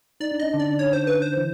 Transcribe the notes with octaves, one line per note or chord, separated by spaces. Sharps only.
D#4 D5
D4
C#4 D#5
D3 D4
D5
C#5
C5
B4
C5
E3 E4